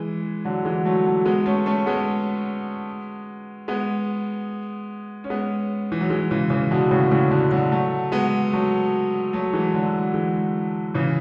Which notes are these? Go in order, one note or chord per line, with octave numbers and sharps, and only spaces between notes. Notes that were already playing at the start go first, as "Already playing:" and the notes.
Already playing: E3 G#3
D3 F#3
E3 G#3
F#3 A3
F#3 A3
G#3 B3
A3 C#4
A3 C#4
G#3 B3
G#3 B3
C#4
G#3 B3
E3
F#3
E3 G#3
C#3 E3
C#3 E3
B2 D3
A2 C#3
A2 C#3
B2 D3
D3 F#3
F#3 A3
G#3 B3
F#3 A3
F#3 A3
E3 G#3
D3 F#3
E3 G#3
C#3 E3